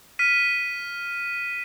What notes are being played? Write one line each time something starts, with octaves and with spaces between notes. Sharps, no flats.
F6 B6 D#7